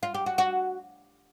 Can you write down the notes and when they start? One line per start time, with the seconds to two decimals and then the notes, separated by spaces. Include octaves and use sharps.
0.03 F4
0.14 G4
0.26 F#4
0.38 F#4